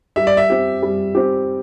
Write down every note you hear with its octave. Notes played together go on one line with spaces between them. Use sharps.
G3 E5
D5
E5
C4 G4
G3
C4 G4